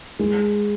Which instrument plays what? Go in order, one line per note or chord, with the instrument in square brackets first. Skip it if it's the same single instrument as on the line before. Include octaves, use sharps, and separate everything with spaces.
[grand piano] G#3